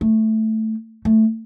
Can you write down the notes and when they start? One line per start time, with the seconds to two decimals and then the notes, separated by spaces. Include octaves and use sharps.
0.01 A3
1.05 A3